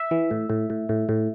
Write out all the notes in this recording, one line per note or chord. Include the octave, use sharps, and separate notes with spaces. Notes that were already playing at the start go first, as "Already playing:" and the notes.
Already playing: E5
E3
A2
A2
A2
A2
A2